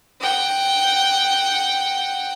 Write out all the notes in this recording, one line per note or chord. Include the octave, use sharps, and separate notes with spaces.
F#5 G5